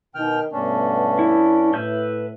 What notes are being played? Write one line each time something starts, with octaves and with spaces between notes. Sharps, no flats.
B2 D#3 G5 F6
G2 B2 A3 B3 C#4 D4
E4
A2 B4 E5 G6